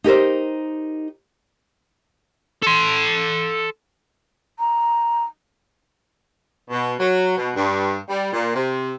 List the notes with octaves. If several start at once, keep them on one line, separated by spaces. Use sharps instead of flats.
D#4 G4 A#4 C5
A4 C6
A#5
B2
F#3
B2
G2
G3
A#2
C3